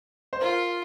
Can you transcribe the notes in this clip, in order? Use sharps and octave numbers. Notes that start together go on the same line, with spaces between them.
C5
F4 A#4